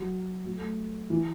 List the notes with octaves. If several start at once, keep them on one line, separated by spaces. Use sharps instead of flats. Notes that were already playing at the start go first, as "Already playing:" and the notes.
Already playing: F#3
F#3
A3
E3